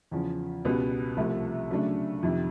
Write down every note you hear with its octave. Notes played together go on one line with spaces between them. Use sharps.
E2 C#3 F3
C#2 B2 G3 B3
C2 C3 F3 A3
C#3 F#3 A3 D4
F2 C3 D#3